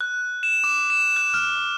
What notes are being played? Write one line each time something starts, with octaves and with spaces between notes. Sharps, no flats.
F#6
E7
D6
E7
F#6
F6